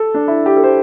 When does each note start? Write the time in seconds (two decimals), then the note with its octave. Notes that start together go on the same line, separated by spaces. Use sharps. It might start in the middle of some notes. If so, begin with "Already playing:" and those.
Already playing: A4
0.14 D4
0.28 E4
0.46 G4
0.56 A4
0.63 C5